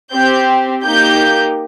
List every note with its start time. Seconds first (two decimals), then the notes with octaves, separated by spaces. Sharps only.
0.12 C4 G4 G6
0.84 A#3 D#4 G4 G6